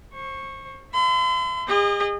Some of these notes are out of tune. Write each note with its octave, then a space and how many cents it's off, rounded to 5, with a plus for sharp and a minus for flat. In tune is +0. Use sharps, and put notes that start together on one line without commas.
C5 +25 C#6 -10
E5 +20 C6 -45
G#4 -45 D#5 -25